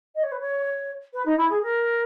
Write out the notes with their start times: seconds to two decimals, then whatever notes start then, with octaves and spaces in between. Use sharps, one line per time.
0.15 D#5
0.23 C#5
0.31 B4
0.40 C#5
1.13 B4
1.25 D#4
1.37 E4
1.49 G#4
1.62 A#4